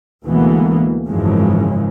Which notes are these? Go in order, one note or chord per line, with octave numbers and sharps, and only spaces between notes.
D2 B2 E3 G#3 A#3 B3
G#1 F#2 C#3 E3 F3 G#3